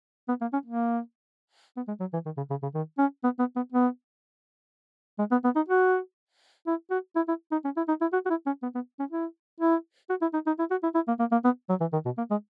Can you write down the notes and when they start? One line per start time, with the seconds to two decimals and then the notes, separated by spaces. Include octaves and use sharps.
0.29 B3
0.41 A#3
0.53 C#4
0.66 A#3
1.77 B3
1.88 G#3
2.00 F#3
2.13 E3
2.26 D#3
2.37 C#3
2.50 C#3
2.62 C#3
2.74 D#3
2.98 C#4
3.24 B3
3.39 B3
3.56 B3
3.72 B3
5.19 G#3
5.31 B3
5.44 B3
5.56 D#4
5.68 F#4
6.67 E4
6.90 F#4
7.16 E4
7.28 E4
7.52 D#4
7.65 C#4
7.77 E4
7.88 D#4
8.01 E4
8.13 F#4
8.26 F#4
8.30 E4
8.46 C#4
8.63 B3
8.75 B3
9.00 C#4
9.11 E4
9.60 E4
10.10 F#4
10.22 E4
10.34 D#4
10.47 D#4
10.59 E4
10.71 F#4
10.83 E4
10.95 E4
11.08 A#3
11.20 A#3
11.32 A#3
11.45 B3
11.70 F#3
11.81 E3
11.93 D#3
12.05 B2
12.18 A#3
12.31 G#3